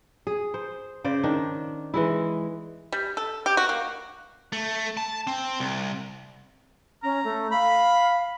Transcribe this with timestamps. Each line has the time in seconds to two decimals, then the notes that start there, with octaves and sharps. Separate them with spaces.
0.27 G#4
0.54 C5
1.04 C#3 C5 D5
1.24 D#3 D4
1.94 E3 G#3 E4
2.92 G3
3.17 A4
3.46 G4
3.57 F#4
3.69 A#3
4.53 A3
4.97 A5
5.27 C4
5.60 C2
7.03 C#4 A#5
7.24 A3
7.52 F5 B5